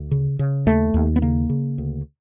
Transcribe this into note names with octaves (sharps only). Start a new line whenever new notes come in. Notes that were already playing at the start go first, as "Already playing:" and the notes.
Already playing: D2
C#3
C#3
D#2 A3
D#2
B3
C#3 A#3
C#3
D2